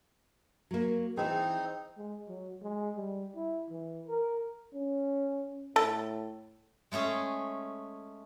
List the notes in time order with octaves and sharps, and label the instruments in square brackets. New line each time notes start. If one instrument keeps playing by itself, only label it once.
[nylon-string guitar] F#3 A#3
[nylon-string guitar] E3 G#4 [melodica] C4 D#4
[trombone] G#3
F#3
G#3
G3
E4
E3
A#4
[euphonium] C#4
[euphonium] A2 [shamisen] A4
[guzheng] G#3 A3 C#4 G#4